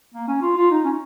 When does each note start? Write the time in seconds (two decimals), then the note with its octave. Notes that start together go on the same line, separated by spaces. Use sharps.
0.14 A#3
0.28 C#4
0.42 F4
0.57 F4
0.71 D#4
0.85 C#4